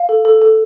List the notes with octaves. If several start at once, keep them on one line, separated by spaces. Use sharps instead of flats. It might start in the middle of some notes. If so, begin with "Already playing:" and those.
Already playing: F5
A4
A4
A4